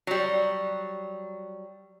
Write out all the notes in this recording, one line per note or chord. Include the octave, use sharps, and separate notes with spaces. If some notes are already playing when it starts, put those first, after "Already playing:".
F#3 G3